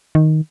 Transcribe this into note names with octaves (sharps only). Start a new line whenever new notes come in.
D#3